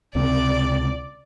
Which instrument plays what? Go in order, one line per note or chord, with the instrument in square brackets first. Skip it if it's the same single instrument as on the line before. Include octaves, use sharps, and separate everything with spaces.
[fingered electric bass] C#2 C3 C4 [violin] D5